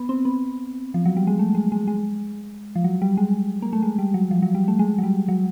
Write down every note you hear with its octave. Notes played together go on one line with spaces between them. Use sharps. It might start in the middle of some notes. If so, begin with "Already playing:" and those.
Already playing: B3
C4
B3
F3
F#3
G3
G#3
A3
G#3
G#3
G#3
F3
F#3
G3
G#3
A#3
A3
G#3
G3
F#3
F3
F#3
G3
A3
G#3
F#3
G3
F#3